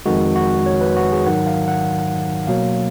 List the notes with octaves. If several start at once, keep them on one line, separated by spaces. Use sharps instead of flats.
F2 D#3 G#3 F#4
F#4
C#5
B4
F#4
G#4
G#2 D#3 F#3 F#5
F5
F#5
B2 F#3 A#3 F5